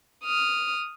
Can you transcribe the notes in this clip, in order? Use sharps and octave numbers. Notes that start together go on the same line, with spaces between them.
D#6 F6